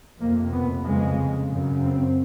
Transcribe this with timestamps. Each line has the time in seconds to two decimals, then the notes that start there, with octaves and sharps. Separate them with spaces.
0.20 F2 C3 A#3
0.52 B3
0.85 F2 C#3 G#3
1.49 F#2 C#3
1.82 C4